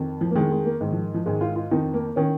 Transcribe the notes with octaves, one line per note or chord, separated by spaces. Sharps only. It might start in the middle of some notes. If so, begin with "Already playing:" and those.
Already playing: F2 D#3
F3
A#3
F2 D#3 G#3
G#3
A#3
G#2 D#3
F3
F3
G#2 D#3 G#3
F4
F4
F2 D#3 D#4
A#3
D#3 C#4